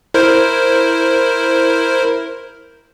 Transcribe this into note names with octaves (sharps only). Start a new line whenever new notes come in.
E4 A#4 C5